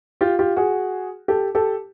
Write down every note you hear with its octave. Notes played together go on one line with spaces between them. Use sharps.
F4 G4
F4 G4
F#4 G#4
G4 A4
G4 A4